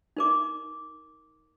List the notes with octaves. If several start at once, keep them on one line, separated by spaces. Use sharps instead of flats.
D#4 A#4 D6